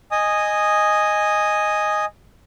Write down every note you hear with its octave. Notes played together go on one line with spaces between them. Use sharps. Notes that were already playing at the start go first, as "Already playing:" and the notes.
D#5 G#5 D#6